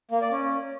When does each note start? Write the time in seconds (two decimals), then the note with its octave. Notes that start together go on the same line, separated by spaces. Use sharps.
0.11 A#3
0.21 D5
0.31 C#4